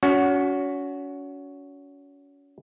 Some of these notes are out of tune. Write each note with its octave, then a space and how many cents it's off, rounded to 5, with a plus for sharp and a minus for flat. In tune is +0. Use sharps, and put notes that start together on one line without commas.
C#4 +30 F#4 +0